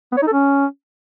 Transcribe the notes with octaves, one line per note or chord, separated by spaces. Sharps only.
B3
C#5
D#4
A4
C#4